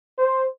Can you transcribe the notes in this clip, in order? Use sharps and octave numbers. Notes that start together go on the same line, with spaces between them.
C5